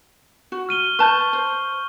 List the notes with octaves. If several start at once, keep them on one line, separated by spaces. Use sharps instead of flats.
F#4
F6 D#7 G7
B4 A5 C#6 G6
C5